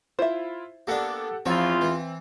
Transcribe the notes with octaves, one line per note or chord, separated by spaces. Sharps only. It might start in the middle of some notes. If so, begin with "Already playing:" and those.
E4 F4 C5 E5
A#3 B3 D4 G4 A4 F#5
E2 F3 C4 F4 C#5
E3